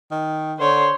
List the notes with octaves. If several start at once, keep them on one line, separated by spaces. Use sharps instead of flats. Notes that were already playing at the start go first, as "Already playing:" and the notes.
D#3
D3 C5 C#5